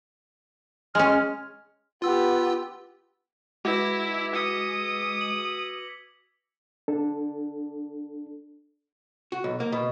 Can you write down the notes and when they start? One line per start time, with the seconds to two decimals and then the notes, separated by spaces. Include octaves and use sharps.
0.95 G#3 C#4 F6
2.02 B3 F4 G4 E6
3.65 G#3 E4 F#4 B4 D6 G#6 A#6
4.35 D#6 E6 B6 C#7
5.21 F#7
6.88 D4 A4
9.32 F#4
9.44 B1
9.60 A#3
9.72 B2